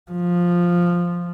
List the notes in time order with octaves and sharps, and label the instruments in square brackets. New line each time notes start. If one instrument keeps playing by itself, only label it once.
[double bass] F3